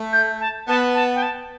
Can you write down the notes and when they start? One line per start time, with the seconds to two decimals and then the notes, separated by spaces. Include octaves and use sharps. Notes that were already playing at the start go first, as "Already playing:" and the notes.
Already playing: A3
0.13 G6
0.40 A5
0.68 B3 A5
0.95 A5
1.15 G5
1.23 A5